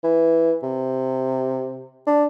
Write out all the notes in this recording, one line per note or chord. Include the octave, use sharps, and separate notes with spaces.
E3
C3
D4